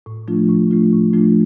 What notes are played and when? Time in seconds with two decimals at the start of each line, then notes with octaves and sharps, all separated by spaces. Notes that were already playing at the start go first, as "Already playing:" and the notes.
0.06 A2
0.28 F3 A3 D4 F4
0.49 A2
0.71 F3 A3 D4 F4
0.92 A2
1.13 F3 A3 D4 F4